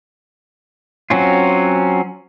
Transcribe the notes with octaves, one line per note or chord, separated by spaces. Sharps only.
F#3 C4 C#4 F4